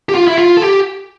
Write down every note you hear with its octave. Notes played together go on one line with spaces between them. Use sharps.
G4
F4
E4
F4
A4
G4